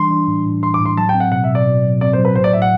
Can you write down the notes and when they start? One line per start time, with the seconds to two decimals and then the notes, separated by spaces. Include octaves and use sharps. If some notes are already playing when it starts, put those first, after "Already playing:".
Already playing: E3 G3 D4 C6
0.11 D4
0.28 A2
0.46 A2
0.62 E3 C6
0.74 D6
0.80 A2
0.86 C6
0.97 F#3 A5
1.09 G5
1.15 C4
1.20 F#5
1.32 B2 F#5
1.44 E5
1.49 B2
1.55 D5
1.67 B2
1.84 F#3
2.01 C4 D5
2.13 C5
2.18 F#3
2.25 B4
2.35 A2 C5
2.44 D5
2.53 A2 E5
2.62 F#5